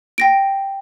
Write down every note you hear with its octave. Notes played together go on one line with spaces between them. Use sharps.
G5 A#6 D7